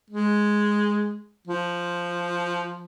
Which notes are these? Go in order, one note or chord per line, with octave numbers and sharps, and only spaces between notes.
G#3
F3